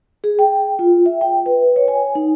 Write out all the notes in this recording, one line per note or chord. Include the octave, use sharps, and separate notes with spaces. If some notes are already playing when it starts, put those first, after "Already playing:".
G#4
G5
F4
E5
G5
B4
C#5
G#5
D#4